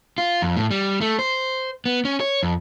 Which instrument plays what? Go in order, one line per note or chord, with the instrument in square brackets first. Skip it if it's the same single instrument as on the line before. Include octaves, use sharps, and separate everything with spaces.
[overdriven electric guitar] F4
F2
A2
G3
A3
C5
B3
C#4
C#5
F2